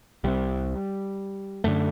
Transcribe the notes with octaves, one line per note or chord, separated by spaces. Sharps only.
C2 C3 G3
F#2 D3 A3